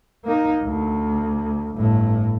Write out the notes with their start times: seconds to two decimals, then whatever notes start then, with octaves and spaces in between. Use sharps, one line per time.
0.24 A#3 D#4
0.64 D2
1.75 G1 A2